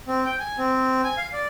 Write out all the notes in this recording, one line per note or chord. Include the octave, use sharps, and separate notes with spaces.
C4
G5
G#5
C4
G#5
F5
D5